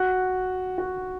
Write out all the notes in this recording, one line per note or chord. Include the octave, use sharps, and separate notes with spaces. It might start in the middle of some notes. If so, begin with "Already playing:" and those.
Already playing: F#4
F#4